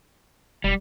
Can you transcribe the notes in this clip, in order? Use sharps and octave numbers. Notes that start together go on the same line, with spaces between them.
E1 G3